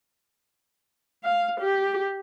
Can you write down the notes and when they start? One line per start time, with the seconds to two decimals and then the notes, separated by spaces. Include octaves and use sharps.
1.24 F5
1.61 G4